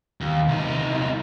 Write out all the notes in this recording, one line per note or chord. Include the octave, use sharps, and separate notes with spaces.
D#2
C2 D#4